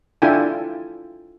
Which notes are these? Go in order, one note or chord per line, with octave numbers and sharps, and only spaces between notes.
D4 E4 F4 A4 G5 G#5